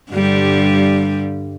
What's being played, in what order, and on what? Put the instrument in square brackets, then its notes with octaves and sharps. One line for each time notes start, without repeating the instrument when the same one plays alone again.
[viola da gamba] G2 D3 G3